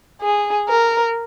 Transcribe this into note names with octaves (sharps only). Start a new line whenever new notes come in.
G#4
A#4